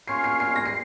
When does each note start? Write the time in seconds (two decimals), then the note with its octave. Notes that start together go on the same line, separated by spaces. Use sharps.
0.08 C#4 F4 A#4 C#5 C7
0.24 C7
0.40 C7
0.56 A#6
0.65 C7